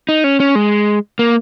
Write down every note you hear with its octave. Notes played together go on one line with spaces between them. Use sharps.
D#4
C#4
C#4
G#3
A#3